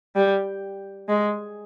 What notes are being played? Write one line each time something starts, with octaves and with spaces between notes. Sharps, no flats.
G3
G#3